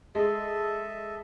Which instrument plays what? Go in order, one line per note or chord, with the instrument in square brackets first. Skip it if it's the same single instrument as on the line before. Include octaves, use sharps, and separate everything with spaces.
[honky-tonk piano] G#3 [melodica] A4 D#5 E5